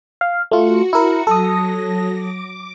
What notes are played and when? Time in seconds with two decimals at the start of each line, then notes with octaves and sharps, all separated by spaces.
0.21 F5
0.51 A3 F4 F#4 C#7
0.93 E4 A#4
1.27 F#3 A4 D#6 A#6
2.14 D6